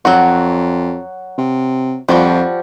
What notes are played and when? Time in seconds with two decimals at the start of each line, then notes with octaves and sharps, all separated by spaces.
0.05 F2 F#3 F#4
1.38 C3
2.09 F2 F3 G3 F#4